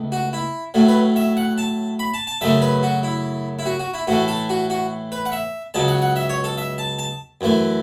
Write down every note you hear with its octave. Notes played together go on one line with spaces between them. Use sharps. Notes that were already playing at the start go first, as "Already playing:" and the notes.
Already playing: C#2 A3
F#4
E4
A2 F#3 A3
B4
E5
F#5
A5
B5
A5
A5
F#2 C#3 F#3 A3 E5
B4
F#4
E4
E4
F#4
F#4
E4
A2 E3 A3 F#4
A4
F#4
F#4
B4
F#5
E5
C#2 C#3 F#3 A5
F#5
F#5
E5
C#5
A4
E5
A5
A5
F#2 E3 A3